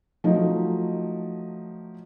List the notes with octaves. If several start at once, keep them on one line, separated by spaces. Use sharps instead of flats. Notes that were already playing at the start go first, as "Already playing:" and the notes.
F3 F#3 A3 D#4